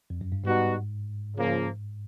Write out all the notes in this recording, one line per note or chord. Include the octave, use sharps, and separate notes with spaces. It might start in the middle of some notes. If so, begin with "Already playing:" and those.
F2
F#2
G2
G#2 G3 B3 D#4 F#4
C#3 F3 A#3